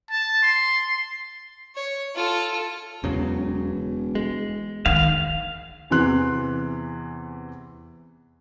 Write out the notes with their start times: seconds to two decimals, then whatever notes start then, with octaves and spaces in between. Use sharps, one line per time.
0.11 A5
0.43 C6
1.75 C#5
2.15 F4 A4
3.04 E1 E2 C#3 F#3
4.15 G#3
4.86 D#3 F5
5.90 E2 C3 E3 C6 F#6